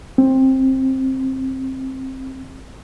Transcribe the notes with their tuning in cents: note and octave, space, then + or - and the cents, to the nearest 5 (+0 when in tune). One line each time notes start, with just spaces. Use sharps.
C4 +15